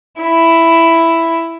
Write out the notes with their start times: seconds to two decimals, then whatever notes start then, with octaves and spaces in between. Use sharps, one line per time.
0.22 E4